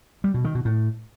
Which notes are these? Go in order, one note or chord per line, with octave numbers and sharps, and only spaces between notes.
G3
B2
D#3
B2
A2